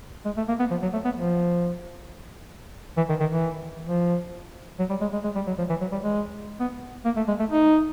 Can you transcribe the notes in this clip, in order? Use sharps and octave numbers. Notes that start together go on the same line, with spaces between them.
G#3
A3
A#3
B3
F3
F#3
A3
B3
F3
E3
D#3
D#3
E3
F3
F#3
G3
G#3
G#3
G#3
G3
F#3
F3
E3
F#3
G3
G#3
B3
A#3
A3
G#3
A3
D#4